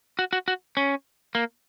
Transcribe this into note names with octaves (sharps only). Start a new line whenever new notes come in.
F#4
F#4
F#4
C#4
A#3